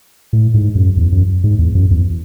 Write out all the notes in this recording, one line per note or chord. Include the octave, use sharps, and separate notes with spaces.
A2
G#2
F#2
E2
F#2
G#2
E2
F#2
E2